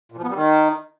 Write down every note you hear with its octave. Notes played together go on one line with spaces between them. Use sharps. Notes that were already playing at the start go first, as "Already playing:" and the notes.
A#2
F3
B3
G3
D#3